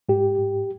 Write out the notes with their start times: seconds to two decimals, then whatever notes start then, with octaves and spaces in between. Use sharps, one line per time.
0.09 G#2 G4
0.38 G#2